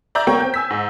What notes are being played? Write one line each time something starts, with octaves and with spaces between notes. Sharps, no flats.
D5 E5 A#5 G6
A#3 B3 A#4 C#5 G5
C4 G5 G6
G#5 E6 B6
G#2